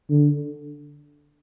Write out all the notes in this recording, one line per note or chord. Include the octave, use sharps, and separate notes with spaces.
D3